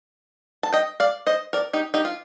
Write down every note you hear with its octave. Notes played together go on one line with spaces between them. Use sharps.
A5
D#5 G5
D5 F5
C5 D#5
A#4 D5
D#4 G4
D#4 G4
F4